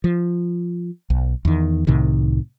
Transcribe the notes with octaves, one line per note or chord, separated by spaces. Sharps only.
F3
B1
E2 D#3
C2 A2 C3 D#3